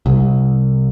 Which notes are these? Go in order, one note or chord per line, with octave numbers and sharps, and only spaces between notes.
C2